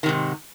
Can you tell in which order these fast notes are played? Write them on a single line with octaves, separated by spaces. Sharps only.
D#3 C3 G#2